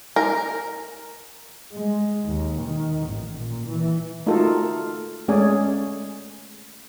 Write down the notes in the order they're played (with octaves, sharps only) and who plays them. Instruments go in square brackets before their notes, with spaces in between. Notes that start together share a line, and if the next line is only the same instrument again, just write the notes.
[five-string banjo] A#4
[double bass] G#3
D#2
D#3
A1
A#2
E3
[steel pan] A3 D#4 F4 F#4 A4 A#4
G#3 A3 C#4 G#4 D5 G#5